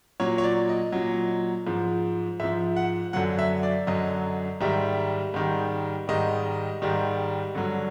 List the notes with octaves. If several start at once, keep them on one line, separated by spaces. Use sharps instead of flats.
A#2 F#3 C#5
C#5
D5
D#5
A#2 F#3
G#2 F3
G#2 F3 E5
F#5
F#2 D3 F#3 F#5
E5
D5
F#2 D3 F#3 D#5
G#2 D#3 G3 E5
G#2 D#3 G3
G#2 D#3 G3 D#5
G#2 D#3 G3
G2 D3 F#3